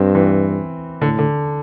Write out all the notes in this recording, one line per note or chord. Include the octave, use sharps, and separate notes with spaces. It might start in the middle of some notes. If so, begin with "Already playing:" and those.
Already playing: G2 C4
E3
A2 D3
D3